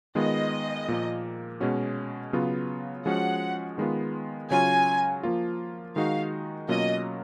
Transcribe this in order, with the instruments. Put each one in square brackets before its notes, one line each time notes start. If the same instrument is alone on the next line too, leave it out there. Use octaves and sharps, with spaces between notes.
[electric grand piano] D#3 G#3 B3 F4 [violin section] D#5
[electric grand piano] A#2 F3 A#3
B2 G#3 C#4 F#4
C#3 F#3 B3 F4
[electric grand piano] F3 G#3 C#4 F#4 [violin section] F#5
[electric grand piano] D#3 G#3 B3 F4
[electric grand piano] C#3 F#3 C#4 F4 [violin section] G#5
[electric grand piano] F3 A#3 F4
[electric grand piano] D#3 G#3 D#4 F#4 [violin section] F5
[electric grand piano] B2 F#3 A#3 C#4 F4 [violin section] D#5